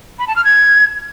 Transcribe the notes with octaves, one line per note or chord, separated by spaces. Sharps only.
B5
A5
F6
G#6